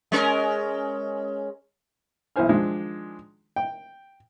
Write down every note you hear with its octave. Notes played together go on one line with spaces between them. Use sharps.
G#3 C#4 A#4
B1 E3 E4 C5 G#5 F6
D#3 F3 G#3 D4
G5